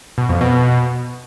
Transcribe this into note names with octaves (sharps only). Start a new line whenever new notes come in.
B2
F2
B2